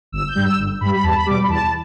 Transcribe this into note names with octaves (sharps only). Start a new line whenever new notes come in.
G1 E6
G6
G2 G3
E6
G1
G2 G3 B5
B5
E2 A5
B5
B2 G3 D6
B5
E2 A5